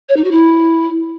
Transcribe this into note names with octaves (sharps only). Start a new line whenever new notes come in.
C#5
D#4
F#4
E4